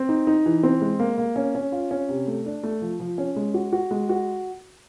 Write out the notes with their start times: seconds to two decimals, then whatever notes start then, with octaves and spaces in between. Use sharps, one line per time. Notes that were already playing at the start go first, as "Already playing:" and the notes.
Already playing: C4
0.09 D#4
0.27 D#4
0.46 E3
0.63 C4
0.82 G#3
0.99 A#3
1.18 A#3
1.36 C#4
1.55 C#4
1.72 F4
1.91 C#4
2.09 C3
2.27 A3
2.46 D4
2.63 A3
2.82 F3
3.00 F3
3.18 C#4
3.36 G#3
3.54 F#4
3.72 F#4
3.91 G#3
4.09 F#4